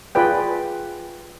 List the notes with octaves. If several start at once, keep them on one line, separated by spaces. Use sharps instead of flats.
F4 G#4 B4 D5 G5